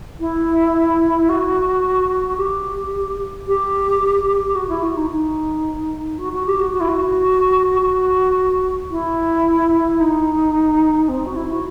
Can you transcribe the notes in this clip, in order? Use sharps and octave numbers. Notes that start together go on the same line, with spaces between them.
E4
F#4
G4
G4
F#4
E4
F#4
D#4
D#4
F#4
F#4
G4
F#4
F#4
E4
F#4
F#4
E4
D#4
C4
F#4
E4
F#4